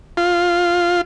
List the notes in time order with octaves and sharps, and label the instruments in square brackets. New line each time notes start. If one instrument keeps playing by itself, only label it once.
[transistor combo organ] F4